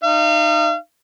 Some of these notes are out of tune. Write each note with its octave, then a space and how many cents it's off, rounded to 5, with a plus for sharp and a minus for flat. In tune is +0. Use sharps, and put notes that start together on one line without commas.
D#4 -30 F5 -40